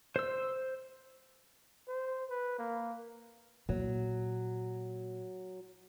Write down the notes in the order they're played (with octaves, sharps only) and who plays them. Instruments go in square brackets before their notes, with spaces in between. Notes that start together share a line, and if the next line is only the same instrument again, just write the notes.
[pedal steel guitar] C5 E6
[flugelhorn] C5
B4
A#3
[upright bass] A#2 [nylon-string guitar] F#3